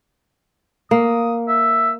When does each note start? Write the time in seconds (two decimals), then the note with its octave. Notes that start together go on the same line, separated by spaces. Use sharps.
0.91 A#3 D#6
1.48 E5